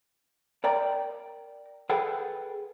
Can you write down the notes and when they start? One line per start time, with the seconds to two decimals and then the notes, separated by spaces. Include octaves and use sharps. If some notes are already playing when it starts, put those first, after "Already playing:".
0.64 A#4 D5 G5 A#5
1.90 G#4 A4 B4 F#5 G5